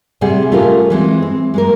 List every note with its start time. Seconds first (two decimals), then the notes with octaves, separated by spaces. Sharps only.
0.21 A2 C3 G3 G#4 F#5
0.52 A3 C#4 F4 G4 A#4
0.90 E3 G#3 C4
1.22 C4
1.54 G#3 A#3 A#4